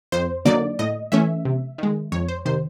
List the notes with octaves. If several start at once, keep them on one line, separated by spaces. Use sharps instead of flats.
F2 C5
D3 F#3 A#3 D#4 D5
A2 D#5
E3 A3 C#4 E5
C3
D#3 G#3
F2 C#5
C5
C3 D#3 C5